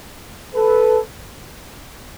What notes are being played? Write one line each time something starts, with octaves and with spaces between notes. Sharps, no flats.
A4 B4